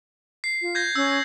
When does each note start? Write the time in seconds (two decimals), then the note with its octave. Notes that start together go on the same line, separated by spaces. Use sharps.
0.44 C7
0.61 F4
0.75 G6 G#6 A#6
0.96 C#4 E6